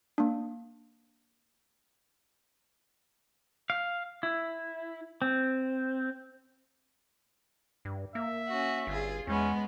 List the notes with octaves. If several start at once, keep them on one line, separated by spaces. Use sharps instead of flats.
A#3 D4
F5
E4
C4
G2
A#3 E5
C#4 F#4
G1 F4 G#4
E2 G#3 B3 C#4